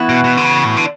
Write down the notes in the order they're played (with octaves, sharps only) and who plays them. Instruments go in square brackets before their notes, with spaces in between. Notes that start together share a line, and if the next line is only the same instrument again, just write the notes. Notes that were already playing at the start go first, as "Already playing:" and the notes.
Already playing: [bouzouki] E3 B3 F#4
[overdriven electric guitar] B2
B2
D3
C#3
A2
D3